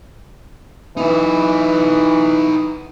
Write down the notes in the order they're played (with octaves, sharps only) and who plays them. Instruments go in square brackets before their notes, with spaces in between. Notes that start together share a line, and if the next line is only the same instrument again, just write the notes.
[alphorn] E3 [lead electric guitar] D#4 B4